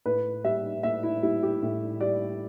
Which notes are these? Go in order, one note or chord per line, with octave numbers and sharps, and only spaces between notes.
A2 B4
G3 E5
A2 E5
E4
G3 E4
G4
A2
G3 D5